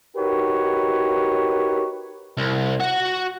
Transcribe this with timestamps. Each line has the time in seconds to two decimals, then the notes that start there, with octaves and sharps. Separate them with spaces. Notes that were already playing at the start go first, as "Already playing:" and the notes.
0.17 D#4 F#4 G4 A#4 B4 C#5
2.37 C2
2.80 F#4 F#5